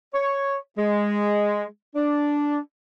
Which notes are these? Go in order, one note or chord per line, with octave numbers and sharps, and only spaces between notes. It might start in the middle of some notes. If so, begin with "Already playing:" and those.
C#5
G#3
D4